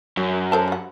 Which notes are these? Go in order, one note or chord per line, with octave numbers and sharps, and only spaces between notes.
F#2 F#4
A4 C5 A5
G3 F#5